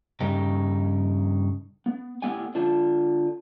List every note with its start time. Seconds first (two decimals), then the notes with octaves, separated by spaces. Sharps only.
0.20 G2 C#3 D#4 G4
1.86 B3
2.22 A2 B3 G4 F#5 G#5
2.55 D3 F4 A5